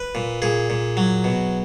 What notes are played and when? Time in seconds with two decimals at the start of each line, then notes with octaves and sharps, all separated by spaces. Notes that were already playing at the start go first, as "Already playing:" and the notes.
Already playing: B4
0.15 A#2
0.42 A#2 G#4
0.70 A#2
0.97 F#3
1.24 B2